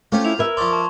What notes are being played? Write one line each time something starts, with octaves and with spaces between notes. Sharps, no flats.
A3 C#4 F4 G4 C5
E4 F7
A#4 B4 E5 G#6
F3 D5 C6 C#6
A5